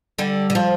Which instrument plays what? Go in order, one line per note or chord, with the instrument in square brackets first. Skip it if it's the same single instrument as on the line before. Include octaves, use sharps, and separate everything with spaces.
[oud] D3 G3
D3
F3